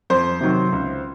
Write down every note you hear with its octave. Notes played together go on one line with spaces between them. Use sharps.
F2 C5
C3 D#3 F#3
C#2